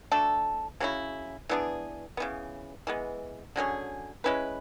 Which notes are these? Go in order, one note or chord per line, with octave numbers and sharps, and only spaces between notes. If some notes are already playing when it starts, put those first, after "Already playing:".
A3 D4 F#4 A4
C#3 F#3 C#4 E4
E3 B3 D4 G#4
C#3 E3 B3
E3 G#3 B3
D3 F#3 C#4 G#4
G#3 C#4 E4 B4